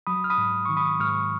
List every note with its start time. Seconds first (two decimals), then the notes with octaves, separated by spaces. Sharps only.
0.07 F#3 B5 D#6
0.24 F6
0.30 B5 D#6
0.38 G#2
0.65 D#3 C#6
0.77 B5 D#6
1.00 G#2 C#6 F6